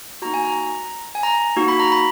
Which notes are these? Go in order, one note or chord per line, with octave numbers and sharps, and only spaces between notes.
A#3 D#4 F#4 A#5
G#5
A#5
G#5
A#5
A#3 D#4 F#4
B5
A#5
B5